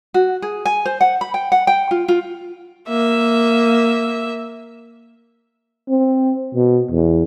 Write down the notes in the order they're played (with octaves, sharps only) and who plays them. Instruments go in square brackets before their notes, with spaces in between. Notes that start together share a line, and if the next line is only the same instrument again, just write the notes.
[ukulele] F#4
G#4
G#5
C5
F#5
B5
G5
F#5
G5
F4
F4
[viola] A#3 E5
[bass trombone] C4
B2
E2